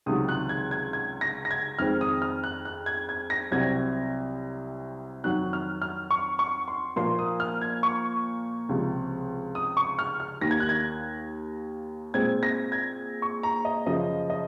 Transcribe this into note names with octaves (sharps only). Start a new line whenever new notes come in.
C#2 C3 D#3 F#3 D#6
F#6
G#6
G#6
G#6
A#6
A#6
G#6
F2 D#3 G#3 C4 F6
D#6
F6
F#6
F#6
G#6
G#6
A#6
C2 C3 F#3 C4 G#6
F2 D#3 F#3 F#6
F6
F6
C#6
C#6
C6
A#2 F3 A#3 C6
D#6
F6
G#6
C#6
C#2 C3 F3
D#6
C#6
F6
F6
D#2 D#3 A#3 A#6
G#6
F#6
G#6
A#2 G#3 C4 G#6
A#6
G#6
C#6
A#5
D#5
F#2 C#3 F3 D#5
D#5